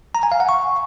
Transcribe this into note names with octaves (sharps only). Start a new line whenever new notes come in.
A#5
G#5
F5
F#5
C#6